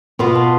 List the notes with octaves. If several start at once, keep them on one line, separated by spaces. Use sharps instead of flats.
B2 B3 F4 C6
B5
A5 C6